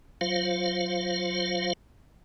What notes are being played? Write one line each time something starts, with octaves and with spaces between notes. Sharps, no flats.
F#3 F4 C5 F5